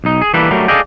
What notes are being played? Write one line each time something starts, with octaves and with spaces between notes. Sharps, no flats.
B1 D#4
G#4
E3 G3 A#3 A4 B4
F#3 G3 A3 A#4
G#4 A4 D5 D#5 F5 G5